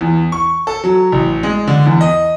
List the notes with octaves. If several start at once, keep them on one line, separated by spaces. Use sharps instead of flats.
E2
C#6
A4
F#3
A1
G#3
D3
E2
D#5